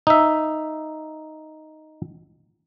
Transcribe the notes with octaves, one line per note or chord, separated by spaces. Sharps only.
D#4 E5